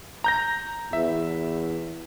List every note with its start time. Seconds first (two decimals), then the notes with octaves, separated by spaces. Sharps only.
0.24 A#5 G6 A#6
0.93 E2 E5